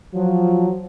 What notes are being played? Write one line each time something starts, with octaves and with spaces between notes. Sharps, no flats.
F3 F#3